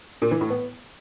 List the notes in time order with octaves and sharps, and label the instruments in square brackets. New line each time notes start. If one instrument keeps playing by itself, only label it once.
[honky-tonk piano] A#2
E3
A2
B3